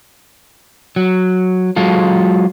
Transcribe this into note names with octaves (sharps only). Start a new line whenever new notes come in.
F#3
F#3 G#3 F4 A4